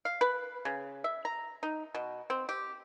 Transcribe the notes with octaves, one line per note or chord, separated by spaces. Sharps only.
F5
B4
C#3
E5
A#5
D#4
B2
C4
G4